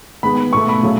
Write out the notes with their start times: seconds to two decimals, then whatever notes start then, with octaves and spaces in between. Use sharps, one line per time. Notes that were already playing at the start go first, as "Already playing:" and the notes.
0.23 D#3 G#3 B3 B5
0.53 B2 A3 C#6
0.68 B5
0.83 C#3 F#3 A3